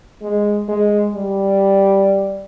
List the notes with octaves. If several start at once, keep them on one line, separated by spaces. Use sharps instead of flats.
G#3
G#3
G3